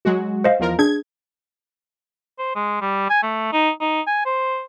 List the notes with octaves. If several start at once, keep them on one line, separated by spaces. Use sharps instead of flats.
F#3 G#3 F#4
C5 D#5 F5
E2 F3 A#4
D4 G#4 G#6
C5
G#3
G3
G#5
A3
D#4
D#4
G#5
C5